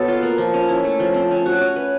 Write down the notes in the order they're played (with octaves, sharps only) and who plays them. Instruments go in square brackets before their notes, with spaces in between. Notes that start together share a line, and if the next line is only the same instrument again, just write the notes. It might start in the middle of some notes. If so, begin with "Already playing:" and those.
Already playing: [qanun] B2 B3 A4 C#5
F4
A#3
F3
C#4
E4
A3
F3
C4
C#4
F#4
C#4
B4